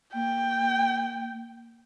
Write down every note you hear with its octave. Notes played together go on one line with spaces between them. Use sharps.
A#3 G5